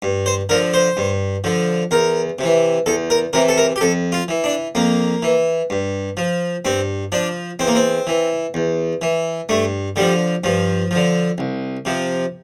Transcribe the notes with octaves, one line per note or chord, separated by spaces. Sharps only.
G2
C5
D3 F3 A#4
C5
G2
D3 F3
E2 A#4
C3 E3
E2 A4
A#4
C3 E3 A#4
A4
A#4
G4
F2 A4
F4
E3
D4
F2 A#3
E3
G2
F3
G2 C4
F3 D4
E2 C4
A#3
C4
E3
E2
E3
G2 A3
D3 F3 G3
G2 F3
D3 F3
C2
C3 F3